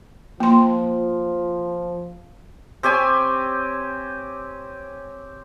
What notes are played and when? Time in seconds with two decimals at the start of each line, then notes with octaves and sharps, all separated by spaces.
0.40 F3 A#3 C6
2.83 C4 G4 C#5 G#5